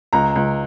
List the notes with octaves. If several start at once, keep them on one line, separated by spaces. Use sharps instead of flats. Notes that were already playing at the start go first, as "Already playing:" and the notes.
C#2 A#5
C#2